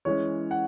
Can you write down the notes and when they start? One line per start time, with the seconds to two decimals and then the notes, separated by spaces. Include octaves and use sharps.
0.05 E3 G#3 C#4 C#5
0.51 F#5